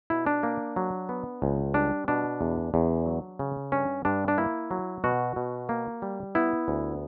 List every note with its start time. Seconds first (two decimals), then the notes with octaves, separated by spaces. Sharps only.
0.10 B2 E4
0.27 D4
0.43 A#3
0.76 F#3
1.09 B3
1.42 C#2
1.74 G3 D4
2.08 B2 D4
2.41 E2
2.74 E2
3.06 F#3
3.39 C#3
3.72 G2 C#4
4.05 G2 D4
4.28 D4
4.38 A#3 E4
4.71 F#3
5.04 B2 F#4
5.36 B2
5.69 A#3
6.02 G3
6.35 B3 E4
6.68 D2